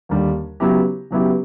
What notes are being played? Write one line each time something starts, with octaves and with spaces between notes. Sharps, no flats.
D#2 D3 G3
C#3 F#3 B3 E4 G4
C#3 F#3 B3 E4 G4